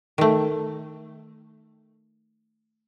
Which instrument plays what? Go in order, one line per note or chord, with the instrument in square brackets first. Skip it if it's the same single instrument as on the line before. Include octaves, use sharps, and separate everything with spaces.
[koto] D#3 A3